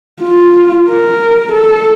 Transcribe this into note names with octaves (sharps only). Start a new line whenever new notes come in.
F4
A#4
A4